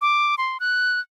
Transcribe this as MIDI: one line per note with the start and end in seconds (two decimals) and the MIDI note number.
0.01 0.35 86
0.38 0.58 84
0.60 1.00 90